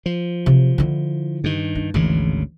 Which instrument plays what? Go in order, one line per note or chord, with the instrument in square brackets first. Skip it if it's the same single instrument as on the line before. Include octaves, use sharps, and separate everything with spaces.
[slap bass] F3
[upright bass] C3 F#3
D3 E4
[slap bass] G2 D#3
[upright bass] D4
[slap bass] G#1 D2 C#3 [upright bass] E3